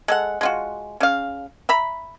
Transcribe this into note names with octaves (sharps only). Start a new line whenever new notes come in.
G#3 A4 F#5
G#3 F4 F#4
C#3 F5
E5 A#5 B5